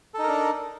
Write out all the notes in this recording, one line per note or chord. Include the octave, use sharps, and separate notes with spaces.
D4 D#4 A4 A#4